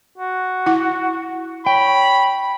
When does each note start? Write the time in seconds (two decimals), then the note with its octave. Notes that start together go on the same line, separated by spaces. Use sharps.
0.18 F#4
0.66 E4 F#5
1.66 C#5 G5 B5